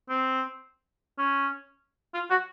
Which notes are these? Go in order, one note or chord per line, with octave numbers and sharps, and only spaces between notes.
C4
C#4
F4
F#4